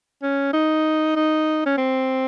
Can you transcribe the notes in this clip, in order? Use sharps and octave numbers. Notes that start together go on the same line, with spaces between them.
C#4
D#4
D#4
C#4
C4